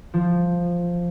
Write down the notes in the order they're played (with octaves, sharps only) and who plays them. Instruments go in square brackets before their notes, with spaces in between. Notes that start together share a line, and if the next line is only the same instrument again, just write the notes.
[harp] F3